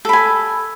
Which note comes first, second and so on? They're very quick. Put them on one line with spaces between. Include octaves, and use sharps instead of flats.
A4 B5 G#5